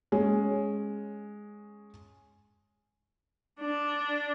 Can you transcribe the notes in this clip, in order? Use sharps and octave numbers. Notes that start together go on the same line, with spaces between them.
G#3 C#4
D4